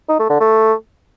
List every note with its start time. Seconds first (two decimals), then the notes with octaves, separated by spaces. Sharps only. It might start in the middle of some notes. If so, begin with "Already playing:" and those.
0.09 D#4
0.19 A3
0.30 D3
0.40 A3